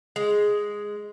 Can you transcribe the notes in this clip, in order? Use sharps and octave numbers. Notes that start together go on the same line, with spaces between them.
G#3